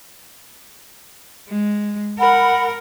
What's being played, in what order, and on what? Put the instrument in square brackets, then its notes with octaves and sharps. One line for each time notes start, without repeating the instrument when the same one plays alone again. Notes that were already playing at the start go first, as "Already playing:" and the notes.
[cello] G#3
[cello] A#4 [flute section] F#5 B5